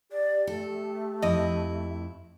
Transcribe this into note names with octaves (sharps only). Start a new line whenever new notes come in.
G4 D5
A3 A4
F2 E4 D#5